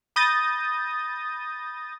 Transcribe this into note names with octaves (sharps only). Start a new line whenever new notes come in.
B5 D#6 G6 A6 A#6